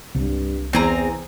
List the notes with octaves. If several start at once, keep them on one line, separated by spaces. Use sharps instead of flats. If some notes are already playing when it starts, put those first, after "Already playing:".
C2 G2
E2 C4 G#4 A#5